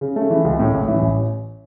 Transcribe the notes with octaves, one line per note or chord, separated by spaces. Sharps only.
C#3
A3
E3
C#2
A2
A1
E3
A1